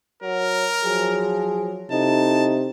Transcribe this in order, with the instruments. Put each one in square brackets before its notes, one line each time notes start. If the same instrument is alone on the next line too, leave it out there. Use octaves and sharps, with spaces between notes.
[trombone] F#3 [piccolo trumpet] A#4
[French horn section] F3 F#3 [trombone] G#4
[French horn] C3 [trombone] D#4 [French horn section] E4 A4 [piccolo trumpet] A5